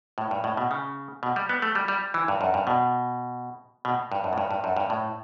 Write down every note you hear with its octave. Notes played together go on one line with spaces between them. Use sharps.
A2
G2
A2
B2
C#3
B2
G3
B3
A3
G3
G3
E3
G2
F#2
G2
B2
B2
G2
F#2
A2
G2
G2
F#2
G2
A2